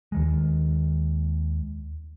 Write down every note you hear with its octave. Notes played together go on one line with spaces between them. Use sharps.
D#2 D#3 G#3